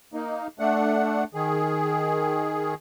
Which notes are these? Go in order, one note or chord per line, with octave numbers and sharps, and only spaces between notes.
A#3 D#4
A3 D4 F#5
D#3 G#4